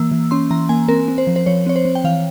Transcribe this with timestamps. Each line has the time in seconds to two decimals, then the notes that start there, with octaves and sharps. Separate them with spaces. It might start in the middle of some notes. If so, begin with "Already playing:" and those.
Already playing: E3 A#3 E6
0.11 E3
0.31 C#4 C6
0.51 E3 A#5
0.69 A#3 G#5
0.88 C4 A#4
1.08 C4
1.18 C5
1.27 F3
1.36 C5
1.46 F3 C#5
1.66 C4 C#5
1.76 C5
1.85 C4
1.95 G5
2.04 E3 F5